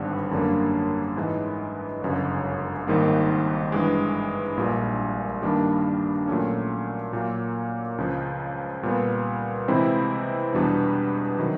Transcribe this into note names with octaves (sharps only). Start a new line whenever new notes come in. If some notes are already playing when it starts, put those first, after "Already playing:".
Already playing: G#1 G2 D3 G3 B3
F#2 D3 G3 A#3
G#2 E3 G#3
G1 F#2 C#3
G#1 G#2 D#3 G3 A#3
G2 E3 G#3
A#1 A#2 G3
G2 D#3 G3 A#3 D4
A#2 F#3 A3 C#4
A#2 F#3 A#3
C#2 C#3 F3
A#2 G3 B3
C3 E3 G#3 C4 E4
E2 B2 G3 B3 D4
C3 D#3 F#3